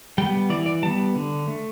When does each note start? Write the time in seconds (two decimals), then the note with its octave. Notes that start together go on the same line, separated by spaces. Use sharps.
0.18 G3 B3 G5
0.50 E3 D5
0.66 D5
0.83 G3 A5
0.86 B3
1.16 D3
1.47 A3